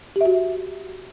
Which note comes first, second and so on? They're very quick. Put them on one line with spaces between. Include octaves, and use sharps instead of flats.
G4 E5 F#4